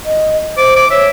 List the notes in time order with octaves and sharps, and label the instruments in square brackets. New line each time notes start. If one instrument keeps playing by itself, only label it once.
[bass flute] D#5
[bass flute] C5 [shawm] D6
[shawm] D6
[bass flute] C#5 [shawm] E5